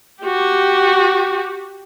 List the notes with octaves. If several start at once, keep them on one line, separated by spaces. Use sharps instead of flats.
F#4 G4